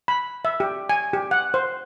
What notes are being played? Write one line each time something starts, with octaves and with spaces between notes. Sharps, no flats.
B5
E5
G4
G#5
G4
F#5
C5